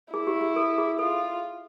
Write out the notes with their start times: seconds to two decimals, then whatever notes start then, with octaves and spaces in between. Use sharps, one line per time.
0.13 E4 G#4
0.27 G4
0.41 G4
0.56 A4
0.78 G#4
0.99 F4 A4